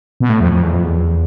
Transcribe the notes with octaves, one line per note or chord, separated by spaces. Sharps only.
B2
A2
F2
F2
E2
F2
E2